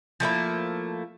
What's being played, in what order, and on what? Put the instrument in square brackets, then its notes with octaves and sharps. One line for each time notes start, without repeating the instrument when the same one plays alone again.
[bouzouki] F3 A3 A#3 E4